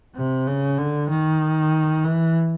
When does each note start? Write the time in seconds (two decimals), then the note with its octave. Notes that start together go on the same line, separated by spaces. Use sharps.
0.16 C3
0.47 C#3
0.78 D3
1.10 D#3
2.04 E3